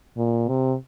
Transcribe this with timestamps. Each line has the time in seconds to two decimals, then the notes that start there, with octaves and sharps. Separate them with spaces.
0.17 A#2
0.48 C3